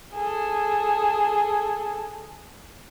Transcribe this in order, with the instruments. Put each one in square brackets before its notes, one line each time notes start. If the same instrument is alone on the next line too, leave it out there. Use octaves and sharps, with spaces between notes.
[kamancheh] G#4 A4